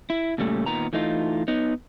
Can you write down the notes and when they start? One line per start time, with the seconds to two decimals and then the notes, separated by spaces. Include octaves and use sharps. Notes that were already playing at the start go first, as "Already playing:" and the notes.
0.10 E4
0.38 A#2 C#3 G3 A3
0.66 A#2 D#3 B3 A#5
0.93 E3 A3 D#4 F4
1.48 B3 D#4